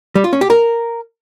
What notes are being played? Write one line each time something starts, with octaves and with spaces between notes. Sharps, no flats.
G3
F4
C#4
G4
A#4